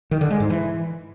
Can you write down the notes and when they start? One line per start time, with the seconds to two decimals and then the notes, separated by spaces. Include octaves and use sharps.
0.11 D#3
0.21 D3
0.31 G#3
0.40 G#2
0.50 E3